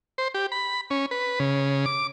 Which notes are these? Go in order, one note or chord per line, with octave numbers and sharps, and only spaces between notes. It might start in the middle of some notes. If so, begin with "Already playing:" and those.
C5
G4
B5
C#4
B4
C#3
D6